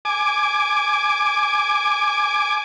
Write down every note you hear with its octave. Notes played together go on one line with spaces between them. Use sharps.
G#5 D6